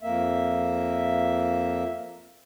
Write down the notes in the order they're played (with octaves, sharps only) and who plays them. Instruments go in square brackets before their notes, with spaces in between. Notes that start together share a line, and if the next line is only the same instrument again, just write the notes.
[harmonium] F2 A#3 E5